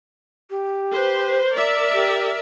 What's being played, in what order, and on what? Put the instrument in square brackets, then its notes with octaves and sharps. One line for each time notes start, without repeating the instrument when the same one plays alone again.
[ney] G4
[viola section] B4 C5
A#4 D5 E5
[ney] G4